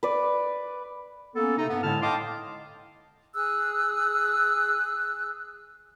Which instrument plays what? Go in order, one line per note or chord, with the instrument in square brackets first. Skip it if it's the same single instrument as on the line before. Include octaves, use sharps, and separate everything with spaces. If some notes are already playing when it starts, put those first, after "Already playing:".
[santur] B4 D5
[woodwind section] A#3 B3 C#4 A4
C3 D#4
G2 B3
A2 D3 G#3 E4 A5 F6
D#5 F5 G5 A5 C6 D6
[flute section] G#4 E6 F#6